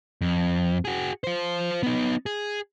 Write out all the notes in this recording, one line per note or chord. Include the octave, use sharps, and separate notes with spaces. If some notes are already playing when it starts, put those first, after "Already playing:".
F2
F#4 G#4
F4 C5
B3 D#4
G#4